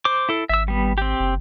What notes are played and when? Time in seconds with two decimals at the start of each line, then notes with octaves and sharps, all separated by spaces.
0.05 C5 D6
0.29 E4 A4
0.49 G#1 E5 E6
0.68 G3 B3
0.98 C4 G4
1.20 F#1